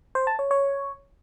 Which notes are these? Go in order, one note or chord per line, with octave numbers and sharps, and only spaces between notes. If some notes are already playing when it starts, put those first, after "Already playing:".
C5
A5
C#5
C#5